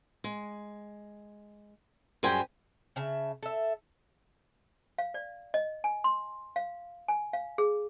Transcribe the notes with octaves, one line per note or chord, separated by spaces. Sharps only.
G#3
F#2 G3 G#4 C5 G5 G#5
C#3 E5 A5
A4 E5
F5
D5
D#5
G#5
C6
F5
G#5
F5
G#4